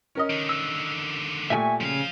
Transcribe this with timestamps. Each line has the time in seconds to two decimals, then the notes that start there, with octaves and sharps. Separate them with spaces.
0.15 C#4 A#4 D#5
0.30 D3 D#3
0.49 E6
1.50 A#2 A3 G4 E5 G#5 C#6
1.81 C#3 F3 F5